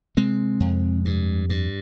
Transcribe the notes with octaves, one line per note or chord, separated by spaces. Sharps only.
C3 G#3 C4
F2
G2
G2